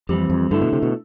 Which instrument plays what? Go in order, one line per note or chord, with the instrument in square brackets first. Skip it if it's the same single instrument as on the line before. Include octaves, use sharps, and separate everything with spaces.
[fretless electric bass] F2 [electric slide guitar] E3 G3 C4 G4
[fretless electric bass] F2
[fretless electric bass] G2 [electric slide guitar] D3 A3 E4
[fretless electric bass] B2
C3
B2